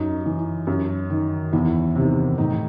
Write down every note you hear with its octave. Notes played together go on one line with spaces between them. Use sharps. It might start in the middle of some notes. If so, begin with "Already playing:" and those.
Already playing: F#2 D#4
E3
F#2
D#3
E2 E4
C3 D#3
A2 D#4